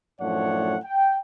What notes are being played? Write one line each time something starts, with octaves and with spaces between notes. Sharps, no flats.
F#2 A2 F3 D4 C#5 F#5
G5